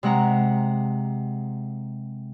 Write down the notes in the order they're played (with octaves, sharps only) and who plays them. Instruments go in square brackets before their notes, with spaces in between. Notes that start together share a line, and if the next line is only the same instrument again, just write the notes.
[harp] C3 G#3 F#5 A#5